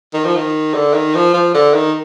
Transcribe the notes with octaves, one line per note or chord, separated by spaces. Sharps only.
D#3
F3
D#3
D3
D#3
F3
F3
D3
D#3